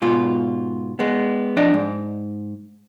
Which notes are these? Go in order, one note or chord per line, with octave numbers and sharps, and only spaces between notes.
G#2 B2 F4
G#3 B3
F2 D4 D5 D#5
G#2